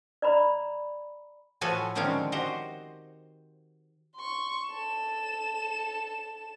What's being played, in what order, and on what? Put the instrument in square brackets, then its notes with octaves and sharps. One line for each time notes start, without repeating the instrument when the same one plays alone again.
[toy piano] D5 A#5 B5
[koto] A2 F3 F#4 A4 B4 G#5
D3 D#3 F3 G#3 C4 C#4
F#4 G4 C5 D#5
[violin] C6 C#6
A4 E7